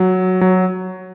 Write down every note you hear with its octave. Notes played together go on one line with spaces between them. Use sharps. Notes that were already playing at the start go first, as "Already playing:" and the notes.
Already playing: F#3
F#3